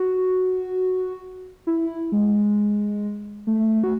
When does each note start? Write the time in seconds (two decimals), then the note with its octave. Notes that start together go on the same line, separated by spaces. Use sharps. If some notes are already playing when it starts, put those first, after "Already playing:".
Already playing: F#4
1.67 E4
2.12 G#3
3.47 A3
3.84 F#4